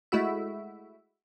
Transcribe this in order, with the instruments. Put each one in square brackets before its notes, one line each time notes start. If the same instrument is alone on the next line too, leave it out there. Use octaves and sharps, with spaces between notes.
[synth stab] G#3 A3 E4 F#4 E5